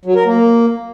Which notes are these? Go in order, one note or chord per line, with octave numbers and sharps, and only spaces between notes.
F#3
A#4
A#3